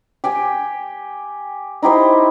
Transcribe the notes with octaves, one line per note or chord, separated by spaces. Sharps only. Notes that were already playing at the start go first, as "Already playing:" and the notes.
G4 G5 G#5
D#4 E4 G4 C5